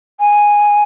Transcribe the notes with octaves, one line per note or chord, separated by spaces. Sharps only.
G#5